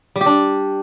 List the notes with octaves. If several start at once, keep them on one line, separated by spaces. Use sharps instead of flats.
G3
G4
D4